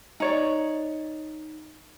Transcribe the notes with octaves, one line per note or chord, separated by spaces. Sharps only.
D#4 C#5 D5